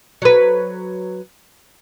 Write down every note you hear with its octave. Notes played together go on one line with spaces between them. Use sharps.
F#3 B4